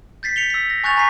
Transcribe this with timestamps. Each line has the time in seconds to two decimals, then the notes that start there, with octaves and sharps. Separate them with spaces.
0.23 G6 A6 B6 C7
0.36 C7 C#7 F7 G7
0.50 E6 B6
0.70 A#6
0.84 G#5 C#6 F#6 G6 A6 F7
0.96 G#5 A#5 C#6 B6 C7